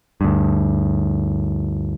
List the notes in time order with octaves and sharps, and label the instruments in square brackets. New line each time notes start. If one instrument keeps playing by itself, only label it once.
[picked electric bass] D2 G2